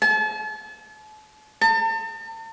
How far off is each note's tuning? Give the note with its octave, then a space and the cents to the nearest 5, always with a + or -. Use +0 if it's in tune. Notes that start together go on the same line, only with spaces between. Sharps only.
A5 -40
A5 +40